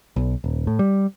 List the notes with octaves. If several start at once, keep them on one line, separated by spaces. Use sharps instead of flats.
B1
D#1
A2
G3